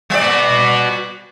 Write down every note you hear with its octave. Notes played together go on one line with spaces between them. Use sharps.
G3 D5
F#4 B4